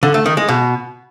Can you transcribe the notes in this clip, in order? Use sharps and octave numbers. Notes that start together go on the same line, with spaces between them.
D3
A3
D#3
G#3
B2